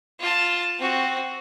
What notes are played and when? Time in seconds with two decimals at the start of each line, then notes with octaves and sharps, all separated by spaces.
0.20 F4 A5
0.79 C4 F#4